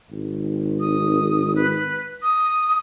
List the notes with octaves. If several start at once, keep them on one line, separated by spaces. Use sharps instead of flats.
G#1
D#6
B4
D#6